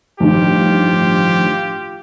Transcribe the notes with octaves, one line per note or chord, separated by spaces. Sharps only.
A1 G2 D#3 F3 F4 G4